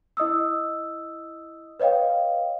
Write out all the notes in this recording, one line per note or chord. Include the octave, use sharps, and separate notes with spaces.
E4 D#5 D#6 E6
B4 C#5 D#5 F5 G5